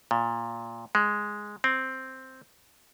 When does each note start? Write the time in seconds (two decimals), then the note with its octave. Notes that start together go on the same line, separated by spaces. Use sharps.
0.11 A#2
0.95 G#3
1.64 C4